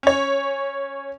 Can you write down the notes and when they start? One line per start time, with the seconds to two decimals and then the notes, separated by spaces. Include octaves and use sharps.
0.03 C#4 C#5